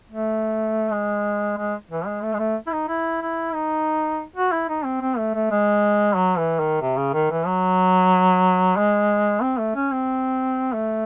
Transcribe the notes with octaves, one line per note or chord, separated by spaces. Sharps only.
A3
G#3
G#3
E3
G#3
A3
G#3
A3
E4
D#4
E4
E4
D#4
F#4
E4
D#4
C4
C4
A3
A3
G#3
F#3
E3
D#3
C3
C#3
D#3
E3
F#3
G#3
C4
A3
C#4
C4
A3